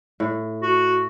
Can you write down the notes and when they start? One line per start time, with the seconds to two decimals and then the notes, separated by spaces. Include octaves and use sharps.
0.20 A2
0.62 F#4